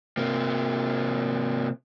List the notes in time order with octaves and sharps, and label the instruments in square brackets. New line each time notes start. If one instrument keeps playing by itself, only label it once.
[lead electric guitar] C3 A#3